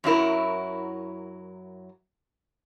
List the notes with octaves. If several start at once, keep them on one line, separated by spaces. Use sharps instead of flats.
F#2 F#3 E4 A#4